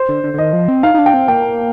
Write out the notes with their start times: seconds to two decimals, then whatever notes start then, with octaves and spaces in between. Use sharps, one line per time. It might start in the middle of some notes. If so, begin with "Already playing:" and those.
Already playing: C5
0.09 D3
0.24 D3
0.34 D3
0.38 D#3 D#5
0.53 F3
0.68 C4
0.83 D#4 F5
0.94 D#4
0.98 D4
1.06 G5
1.14 C4
1.28 A#3 G5